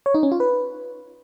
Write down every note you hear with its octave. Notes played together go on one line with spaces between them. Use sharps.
C#5
D#4
C#4
F4
B4